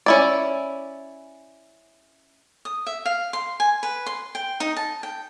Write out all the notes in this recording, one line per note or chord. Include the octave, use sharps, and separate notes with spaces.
C#4 E4 D5
D#6
E5
F5
C6
G#5
B4
C6
G5
D#4
A5
G5